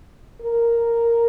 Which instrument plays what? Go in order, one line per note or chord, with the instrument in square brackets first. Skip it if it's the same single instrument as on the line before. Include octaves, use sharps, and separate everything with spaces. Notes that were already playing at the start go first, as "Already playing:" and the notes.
[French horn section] A#4